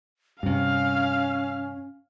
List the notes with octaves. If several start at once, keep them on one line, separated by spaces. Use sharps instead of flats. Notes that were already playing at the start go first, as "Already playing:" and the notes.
G2 C3 C#4 F5 F6